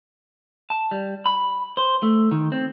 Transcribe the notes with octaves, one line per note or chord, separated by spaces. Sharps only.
A5
G3
B5
C5
A3
D#3
C4